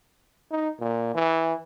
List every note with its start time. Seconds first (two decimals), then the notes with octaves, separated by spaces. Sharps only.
0.51 D#4
0.80 A#2
1.15 E3